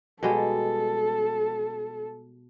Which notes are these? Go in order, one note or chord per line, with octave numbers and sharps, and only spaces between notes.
B2 G3 G#3 A4